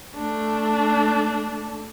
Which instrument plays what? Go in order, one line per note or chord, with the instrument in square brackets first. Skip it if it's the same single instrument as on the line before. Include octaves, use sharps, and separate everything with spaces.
[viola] A3 D4